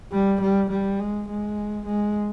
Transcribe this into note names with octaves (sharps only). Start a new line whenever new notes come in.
G3
G3
G3
G#3
G#3
G#3